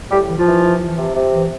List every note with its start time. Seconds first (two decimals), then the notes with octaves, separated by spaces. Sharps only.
0.11 A2 G3 G4
0.29 E3
0.37 F3 F4
0.46 E3
0.63 E3
0.81 E3
0.98 C3
1.16 C3
1.33 E3